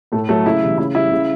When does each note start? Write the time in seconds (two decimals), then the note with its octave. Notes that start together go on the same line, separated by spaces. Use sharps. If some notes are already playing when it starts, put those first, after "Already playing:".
0.12 A2 A3
0.29 F#3 A3
0.46 C#3 E4
0.62 E3 G3
0.78 C#3 E4
0.95 G3 E4
1.11 C#3